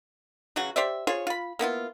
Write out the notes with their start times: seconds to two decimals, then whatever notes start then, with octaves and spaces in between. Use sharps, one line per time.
0.56 C#3 E3 F#3 F#4
0.76 G4 C5 D5 E5
1.07 F4 G#4 C5 C#5
1.27 F4 B5
1.59 A#3 B3 E4 F4